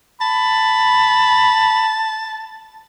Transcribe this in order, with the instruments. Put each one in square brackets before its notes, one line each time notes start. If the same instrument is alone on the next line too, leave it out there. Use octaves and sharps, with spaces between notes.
[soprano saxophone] A5 [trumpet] B5